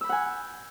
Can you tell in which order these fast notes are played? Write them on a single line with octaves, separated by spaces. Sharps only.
E6 B5 G6 F#5 G#5